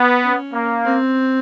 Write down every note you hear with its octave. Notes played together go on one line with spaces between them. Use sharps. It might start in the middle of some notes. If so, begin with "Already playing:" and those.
Already playing: B3
C#4
A#3
C4